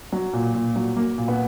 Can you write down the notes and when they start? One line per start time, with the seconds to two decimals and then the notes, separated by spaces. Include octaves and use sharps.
0.12 F#3
0.33 A#2
0.54 A#2
0.76 F#3
0.96 F#3 A#3
1.18 A#2
1.28 B3